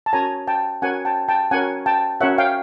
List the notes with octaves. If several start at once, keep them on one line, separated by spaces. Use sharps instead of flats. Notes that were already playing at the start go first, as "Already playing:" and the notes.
A5
C#4 F#4 A#4 C#5 G#5 A#5
G5 A5
C#4 F#4 A#4 C#5 F#5 G#5
G5 A5
G5 A5
C#4 F#4 A#4 C#5 F#5 G#5
G5 A5
C#4 F#4 A#4 C#5 E5 F#5
F5 G5